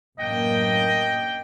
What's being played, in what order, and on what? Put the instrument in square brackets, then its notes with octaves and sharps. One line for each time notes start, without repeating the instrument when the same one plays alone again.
[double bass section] A1 F#2 A#3 [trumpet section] D4 G5 [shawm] D#5